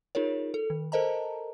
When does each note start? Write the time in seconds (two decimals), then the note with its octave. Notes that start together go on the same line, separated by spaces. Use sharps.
0.15 D#4 F4 G#4 A#4 C#5
0.54 A4
0.70 D#3
0.92 A4 A#4 C5 D#5 A5 A#5